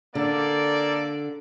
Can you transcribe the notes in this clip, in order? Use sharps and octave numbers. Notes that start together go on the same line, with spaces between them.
D3 A#3 A4 D5